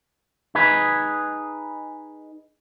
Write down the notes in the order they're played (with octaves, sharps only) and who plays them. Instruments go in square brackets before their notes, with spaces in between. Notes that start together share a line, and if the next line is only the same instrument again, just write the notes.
[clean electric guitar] D#4 G#4 B4